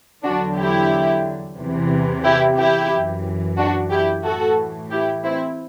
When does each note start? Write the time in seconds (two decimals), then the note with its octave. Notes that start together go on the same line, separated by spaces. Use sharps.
0.23 E2 D3 F#3 D4 F#4
0.57 E4 G4
1.57 E2 C3 E3
2.24 E4 G4
2.57 E4 G4
2.91 F#2 E3
3.58 D4 F#4
3.91 E4 G4
4.24 A2 E3 F#4 A4
4.91 E4 G4
5.24 C4 E4